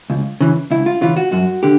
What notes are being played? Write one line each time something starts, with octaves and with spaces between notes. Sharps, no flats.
C#2
C#3 E3
C#2 E4
F4
C#3 E3 F4
F#4
F#2 F#4
D3 G4